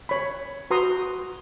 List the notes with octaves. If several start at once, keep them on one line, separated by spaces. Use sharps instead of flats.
C#5 B5
F#4 B4 A#5 C6 D#6